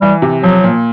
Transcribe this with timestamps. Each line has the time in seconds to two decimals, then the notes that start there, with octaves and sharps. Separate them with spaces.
0.01 E3 G3
0.22 C3
0.43 F3 F#3
0.64 A#2